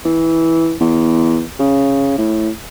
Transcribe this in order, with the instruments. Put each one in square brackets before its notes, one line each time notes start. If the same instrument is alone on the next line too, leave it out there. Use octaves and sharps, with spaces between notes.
[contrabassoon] E3
E2
C#3
A2